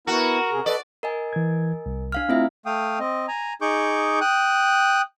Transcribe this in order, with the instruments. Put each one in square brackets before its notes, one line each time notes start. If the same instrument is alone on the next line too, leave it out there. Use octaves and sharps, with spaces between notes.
[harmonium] B3 E4 [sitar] F#4 [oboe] A#4
[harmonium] C3 G#4
[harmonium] A4 B4 D#5 [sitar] D5
[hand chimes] A#4 D#5 G#5
[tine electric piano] E3 G#6
C2
[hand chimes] D4 F5 F6
[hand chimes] A3 E4 E5 [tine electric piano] C4 F4
[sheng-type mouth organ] A3 F5 G5 D#6
C4 D#5
G#5 A#5
D#4 G#4 C#6 D6 G6
G5 D#6 F#6